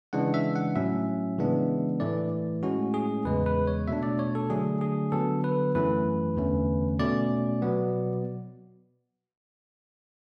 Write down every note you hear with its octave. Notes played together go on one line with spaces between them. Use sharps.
C#3 E3 G#3 D4 F#5
E5
F#5
A2 F#3 C#4 E5
C#3 E3 G#3 B3 D4
A2 E3 A3 D5
A2 G#3 C#4 F#4
G#4
E2 C#3 G#3 B4
B4
C#5
B2 A3 D4 E5
D5
C#5
A4
D3 F#3 A3 D4 G#4
G#4
D3 F#3 B3 A4
B4
F#2 E3 A3 C#4 B4
E2 D3 A3 C#4
B2 A3 C#4 D5
B2 F#3 B3